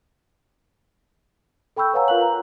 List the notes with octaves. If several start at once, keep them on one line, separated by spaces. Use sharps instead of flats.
A4 G5 B5 C#6 E6 G6
B4 C#5 F5 F#5 G#5 A#5
F4 A#4 F5 F#6 F#7
A#5